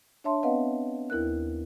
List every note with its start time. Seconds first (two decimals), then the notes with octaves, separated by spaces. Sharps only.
0.24 D4 C#5 E5 A5 C6
0.43 B3 C4 B4 D#5 F5 F#5
1.10 D#2 E4 A#4 F#6